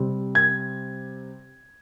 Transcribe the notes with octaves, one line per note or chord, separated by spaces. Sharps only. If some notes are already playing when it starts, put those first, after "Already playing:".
Already playing: C3 G3 C4
G#6